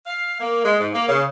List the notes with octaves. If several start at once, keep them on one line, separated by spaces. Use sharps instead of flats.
F5
A#3
G#3
G#2
A#3
C#3